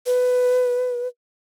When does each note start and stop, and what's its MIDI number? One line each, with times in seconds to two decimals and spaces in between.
0.06 1.08 71